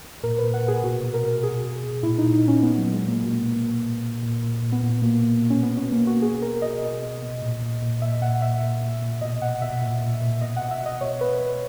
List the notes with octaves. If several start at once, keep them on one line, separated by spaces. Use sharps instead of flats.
A#2 A#4
A#2 B4
F#5
A#2
G#4
B2 F#4
B2
A#4
B2
B2 G#4
B2
B2
A#2 E4
A#2 D#4
D#4
A#2 C#4
A#2 B3
A#2 F#3
G#3
A#2 A#3
B2
B2
B2
A#2
A#2
A#2
A#2
A#2
B3
A#2
B2 A#3
B2
B2
C#4
B2 B3
B2 C#4
A#3
B2
F#4
B2 G#4
B2 A#4
B2 D#5
B2
B2
B2
A#2
A#2
A#2
A#2 E5
A#2 F#5
A#2 E5
A#2
A#2
A#2
B2 D#5
B2 F#5
B2 E5
A#2
A#2
A#2
B2 D#5
B2 F#5
E5
B2 D#5
B2 C#5
B2 B4
B2